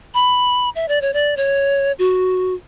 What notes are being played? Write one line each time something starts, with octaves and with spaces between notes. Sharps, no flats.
B5
E5
D5
C#5
D5
C#5
F#4